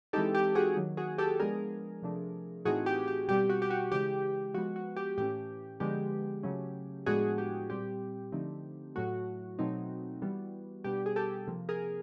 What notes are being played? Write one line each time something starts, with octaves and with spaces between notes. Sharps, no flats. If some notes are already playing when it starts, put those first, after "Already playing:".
E3 G#3 C4 D#4 G4 A4
G4
F#4 G#4
D#3 F#3 A#3
F#4 G#4
G4 A4
F3 G#3 B3 D4 G#4 A#4
C3 F3 A3 D4
A2 E3 A3 C4 D#4 F#4 G#4
G4
G4
B2 G3 C4 G4
F#4
G4
F#4
C#3 E3 G#3 G4
F3 G#3 B3 F#4
F#4
G4
A2 E3 A3 C#4 G4
D3 F3 G#3 B3 G4
C#3 F#3 A3 C#4
A2 F3 G#3 B3 D4 F#4 G#4
G4
A#2 G3 C4 G4
D3 F3 A3 C4 D#4
A2 F#3 A3 F#4
B2 F#3 A3 C4 D#4
E3 G3 B3
B2 G3 B3 D4 G4
G#4
G4 A4
C3 F3 A#3
G#4 A#4